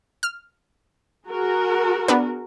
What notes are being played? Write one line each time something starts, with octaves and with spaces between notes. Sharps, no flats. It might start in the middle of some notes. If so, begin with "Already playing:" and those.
F6
F#4 G#4 A#4
B3 D4 B4